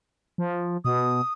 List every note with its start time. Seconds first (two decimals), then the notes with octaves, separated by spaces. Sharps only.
0.38 F3
0.85 B2 D#6